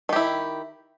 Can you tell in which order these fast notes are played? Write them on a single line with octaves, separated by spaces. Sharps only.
D#3 G4 E4